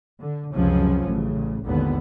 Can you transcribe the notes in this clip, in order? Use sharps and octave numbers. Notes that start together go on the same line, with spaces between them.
D3
C#2 F#2 C3 F3 F#3 C#4
A1 C#3
G#1 D#2 A#2 D3 B3